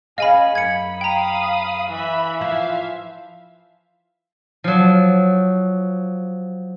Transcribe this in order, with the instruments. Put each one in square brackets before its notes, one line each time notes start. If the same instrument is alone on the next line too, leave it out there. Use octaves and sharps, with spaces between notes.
[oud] C#4 F5 [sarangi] G#4 [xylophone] D#5 G#5 B5
[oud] F#2 [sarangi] B5 [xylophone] G#6 C#7
[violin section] F5 D#6 [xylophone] G5 A#5
[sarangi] E3 [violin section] E5 B5
[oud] F3 E4 [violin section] E5 F5
[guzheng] F3 F#3